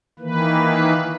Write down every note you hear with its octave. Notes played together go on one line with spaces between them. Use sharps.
D#3 E3 A#3 B4